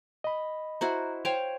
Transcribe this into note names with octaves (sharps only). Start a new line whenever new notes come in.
D#5 B5
E4 F#4 C5 A#5
C5 C#5 F5 G5 D7 F7